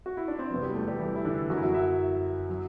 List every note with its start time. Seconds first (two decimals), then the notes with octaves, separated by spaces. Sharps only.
0.06 F#4
0.17 E4
0.28 D4
0.39 C4
0.50 E2 C3 F#3 B3
0.62 G3 G4
0.75 A3 A4
0.88 G3 G4
0.99 E3 E4
1.16 E4
1.25 D3 D4
1.50 F#2 F#4
1.53 F#3
1.57 E4
1.64 F#3 F#4
1.74 E4 E5
2.50 F#3